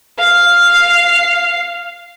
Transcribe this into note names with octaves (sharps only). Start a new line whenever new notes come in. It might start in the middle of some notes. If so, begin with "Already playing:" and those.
F5 C7